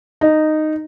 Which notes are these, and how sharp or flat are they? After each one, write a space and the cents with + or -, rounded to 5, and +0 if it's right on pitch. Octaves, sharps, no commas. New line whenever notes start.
D#4 -10